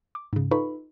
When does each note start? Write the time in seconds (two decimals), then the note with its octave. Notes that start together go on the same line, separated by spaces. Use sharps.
0.15 D6
0.33 G#2 C#3
0.51 D#4 F4 A4 B4 B5 C#6